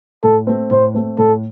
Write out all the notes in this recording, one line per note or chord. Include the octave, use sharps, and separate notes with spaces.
A2 A4
A3 C4
A2 C5
A3 C4
A2 A4